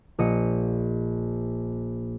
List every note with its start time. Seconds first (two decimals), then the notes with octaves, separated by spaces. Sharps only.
0.19 A#1 D#5 C#7